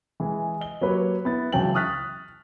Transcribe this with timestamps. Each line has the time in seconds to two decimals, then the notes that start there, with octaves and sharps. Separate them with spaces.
0.20 E3 G#3 G#4
0.61 D#5 G7
0.81 F#3 A#3 G4 B4 C#5
1.25 B3 E4 A6
1.52 C#2 E3 F#3 G5 A5 F#7
1.74 C#6 D#6 F6 F#6 A6 B6